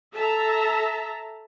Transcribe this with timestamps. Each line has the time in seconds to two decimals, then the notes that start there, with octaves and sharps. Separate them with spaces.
0.13 A4 E5 A5 A#5